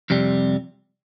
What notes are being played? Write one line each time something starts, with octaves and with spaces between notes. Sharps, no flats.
F2 C3 G3